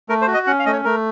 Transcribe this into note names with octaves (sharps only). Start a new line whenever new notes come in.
A3 A#4
C5
F#4
D#5
C#4 F#5
F5
A3 D#5
C#5
A3 A#4